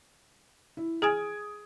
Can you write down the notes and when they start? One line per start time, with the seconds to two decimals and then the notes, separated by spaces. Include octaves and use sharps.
0.77 E4
1.02 G#4 G#5 D#6 G#6 D7